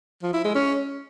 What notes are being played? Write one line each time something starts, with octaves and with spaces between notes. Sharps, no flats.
F3
E4
G#3
C#4